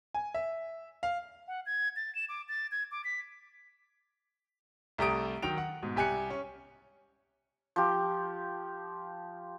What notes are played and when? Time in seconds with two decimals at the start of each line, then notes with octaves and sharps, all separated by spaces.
0.14 G#5
0.34 E5
1.03 F5
1.48 F#5
1.66 G#6
1.96 A6
2.15 E7
2.29 D6
2.49 A6
2.71 G#6
2.91 D6
3.04 B6
4.98 C2 A3 G4 A#5 D#6 D7
5.42 D#3 F#3 G5 D7 F7
5.58 F#5
5.82 G#2 B2
5.96 C2 G4 G#5 F#6 C#7
6.30 C#4
7.76 F3 G4